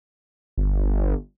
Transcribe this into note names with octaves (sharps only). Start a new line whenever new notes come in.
G1